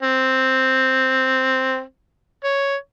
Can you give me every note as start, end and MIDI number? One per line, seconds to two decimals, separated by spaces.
0.02 1.81 60
2.44 2.76 73